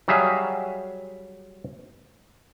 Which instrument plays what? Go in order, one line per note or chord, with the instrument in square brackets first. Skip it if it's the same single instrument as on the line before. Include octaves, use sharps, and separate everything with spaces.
[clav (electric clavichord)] F#3 G3 G#4 E5 F5